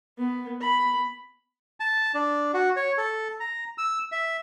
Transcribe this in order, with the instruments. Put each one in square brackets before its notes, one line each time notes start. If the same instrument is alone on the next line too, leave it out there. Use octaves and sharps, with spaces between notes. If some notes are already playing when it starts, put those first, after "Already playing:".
[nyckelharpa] B3
B5
[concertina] A5
D4
F#4
C#5
A4
A#5
E6
E5